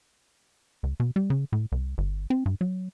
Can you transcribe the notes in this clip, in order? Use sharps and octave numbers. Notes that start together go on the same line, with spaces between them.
C#2
B2
G3
C#3
A2
C2
G1
C4
G2
F#3